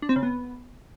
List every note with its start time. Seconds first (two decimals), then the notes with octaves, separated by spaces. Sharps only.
0.02 D4
0.09 C4
0.16 C#3
0.23 B3